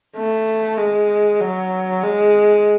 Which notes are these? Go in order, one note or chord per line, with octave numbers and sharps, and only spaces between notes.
A3
G#3
F#3
G#3